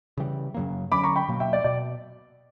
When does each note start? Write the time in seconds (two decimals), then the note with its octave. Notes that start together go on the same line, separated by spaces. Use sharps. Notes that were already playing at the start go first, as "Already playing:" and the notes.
0.18 C#3 E3 G3
0.54 F#2 C#3 F#3 A#3
0.92 D3 F#3 C#4 B5 D6
1.03 A#5 C#6
1.16 G5 B5
1.29 B2 F#3 A#3
1.40 E5 G5
1.53 D5
1.64 B2 D5